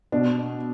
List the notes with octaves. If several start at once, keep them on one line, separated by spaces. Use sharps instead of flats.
B2 D4